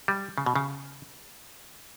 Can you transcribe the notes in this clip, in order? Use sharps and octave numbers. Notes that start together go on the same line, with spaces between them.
G3
C#3
B2
C#3